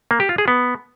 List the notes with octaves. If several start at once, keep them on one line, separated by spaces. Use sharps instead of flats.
A#3
G4
F4
G#4
B3